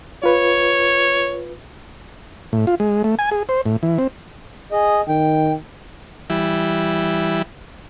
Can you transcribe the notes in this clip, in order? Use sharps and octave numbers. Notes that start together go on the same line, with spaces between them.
F4 B4 C#5
A2
F4
G#3
A3
G#5
G#4
C5
A2
E3
C4
G#4 D#5
D#3 G5
E3 G3 E4